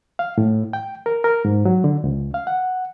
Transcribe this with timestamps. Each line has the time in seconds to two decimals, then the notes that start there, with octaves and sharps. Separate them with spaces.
0.19 F5
0.38 A2
0.73 G5
1.06 A#4
1.24 A#4
1.45 G#2
1.65 F#3
1.84 D3
2.04 C#2
2.34 F5
2.47 F#5